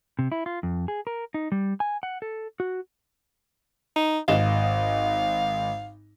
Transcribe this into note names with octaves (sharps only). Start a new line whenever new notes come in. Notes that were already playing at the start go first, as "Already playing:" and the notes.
C3
E4
F4
F2
G#4
A#4
D#4
G3
G#5
F#5
A4
F#4
D#4
G#1 D#5 F5 E7